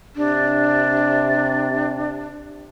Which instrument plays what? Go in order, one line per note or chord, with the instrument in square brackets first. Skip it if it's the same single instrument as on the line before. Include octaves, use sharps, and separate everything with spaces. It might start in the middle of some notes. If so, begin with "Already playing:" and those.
[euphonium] C3 [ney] D4